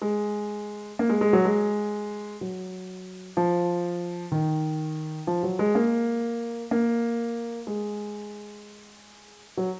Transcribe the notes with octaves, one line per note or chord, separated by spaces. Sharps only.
G#3
A#3
G#3
G#3
F#3
G#3
F#3
F3
D#3
F3
F#3
G#3
A#3
A#3
G#3
F#3